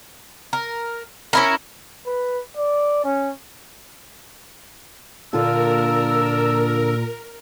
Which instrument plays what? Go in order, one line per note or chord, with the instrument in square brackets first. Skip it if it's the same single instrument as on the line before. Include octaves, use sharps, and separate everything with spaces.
[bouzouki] A#4
C#4 E4 A#4
[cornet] B4
D5
C#4
[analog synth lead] A#2 [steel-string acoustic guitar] D3 F4 [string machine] A#4 [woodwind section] D5 E6